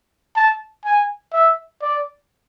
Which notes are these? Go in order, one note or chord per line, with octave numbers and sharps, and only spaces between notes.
A5
G#5
E5
D5